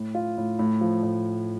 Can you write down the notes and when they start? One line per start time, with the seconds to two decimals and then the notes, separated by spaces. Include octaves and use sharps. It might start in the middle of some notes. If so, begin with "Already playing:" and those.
Already playing: A2
0.15 F4
0.38 A2
0.59 A2
0.81 F3
1.03 A2